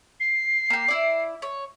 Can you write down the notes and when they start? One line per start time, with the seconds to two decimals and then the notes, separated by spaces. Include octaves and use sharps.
0.20 C7
0.70 A#3 G4
0.88 E4 D5
1.42 C#5